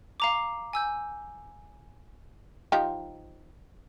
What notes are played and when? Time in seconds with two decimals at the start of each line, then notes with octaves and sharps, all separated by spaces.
0.20 F5 A#5 D6
0.73 G#5 E6 G6
2.72 F3 D#4 G4